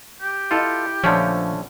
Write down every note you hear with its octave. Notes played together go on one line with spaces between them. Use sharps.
G4
E4 F4 A4 D#5
A#1 D3 F3 A3 C#4